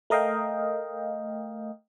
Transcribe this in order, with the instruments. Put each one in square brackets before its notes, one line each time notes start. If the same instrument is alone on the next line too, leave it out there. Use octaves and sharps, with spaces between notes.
[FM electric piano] A3 A#4 D#5 F5 G5